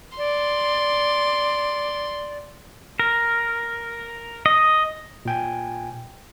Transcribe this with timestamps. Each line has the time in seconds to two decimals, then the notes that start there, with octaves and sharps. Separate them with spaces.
0.18 D5 C6
2.99 A#4
4.46 D#5
5.25 A#2 G5 G#5